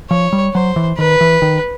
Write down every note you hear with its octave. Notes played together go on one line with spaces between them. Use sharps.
F3 C#5
G3
F#3 C5
E3
D#3 B4
E3
D#3